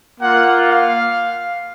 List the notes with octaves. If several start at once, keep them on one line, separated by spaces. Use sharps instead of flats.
A#3 F4 F#5
F5